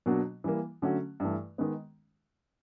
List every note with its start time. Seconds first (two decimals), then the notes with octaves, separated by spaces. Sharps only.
0.06 B2 F#3 A#3 D4 F#4
0.44 E3 G3 A#3
0.82 D3 F#3 A3 C#4 F#4
1.20 G2 E3 A3
1.58 D#3 G#3 B3